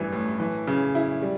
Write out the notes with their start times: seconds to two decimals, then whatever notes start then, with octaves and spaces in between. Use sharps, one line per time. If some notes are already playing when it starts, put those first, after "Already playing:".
Already playing: A1 G2 E3
0.12 A2
0.40 E3
0.67 C#3
0.95 E4
1.22 G3